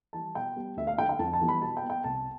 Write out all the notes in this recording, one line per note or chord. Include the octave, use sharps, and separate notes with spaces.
E3 G3 A5
B2 G5
G3 B3
D2 E5
F5
D3 A3 G5
G5
F2 A5
A5
E3 G3 B3
B5
B2 A5
G5
B3
G5
C2 A5